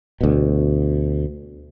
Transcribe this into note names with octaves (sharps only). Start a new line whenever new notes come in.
D2 B2